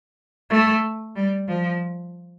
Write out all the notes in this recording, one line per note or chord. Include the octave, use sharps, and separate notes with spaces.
A3
G3
F3